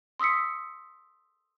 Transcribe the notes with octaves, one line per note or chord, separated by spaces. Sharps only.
C6 D#6 E6 B6 C#7